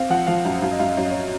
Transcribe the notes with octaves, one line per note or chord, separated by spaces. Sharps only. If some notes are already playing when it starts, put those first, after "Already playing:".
Already playing: C4 F5
F3 F#5
F3 F5
F#2
F#2 F5
D#5
F#2 F5
D#5
F#2 C#5
D#5
C#5